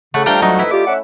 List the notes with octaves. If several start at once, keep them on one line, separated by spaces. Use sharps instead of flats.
C#3 A3 F#5 C#6
F3 G3 A3 D4 G4 F5 G5 A#5
F#3 D#4
F2 E4 B4 E5
F4 G4 D5
C#4 E5 F#5